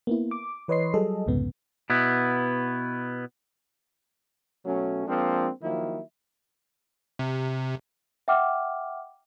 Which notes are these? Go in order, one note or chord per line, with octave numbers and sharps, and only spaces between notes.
A#3 B3 E4
D6
E3 B4 C#5 D#5 C6 C7
F#3 G3 G#4 A4 D#5
C2 F2 G#2 C#3 B3
B2 B3 E4
B2 F#3 A3 C#4
F3 G#3 A#3 C4 D4
D#3 F3 F#3 A#3 E4
C3
E5 F#5 G5 D6 F6